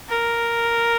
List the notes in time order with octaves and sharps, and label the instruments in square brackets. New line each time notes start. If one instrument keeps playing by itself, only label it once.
[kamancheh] A#4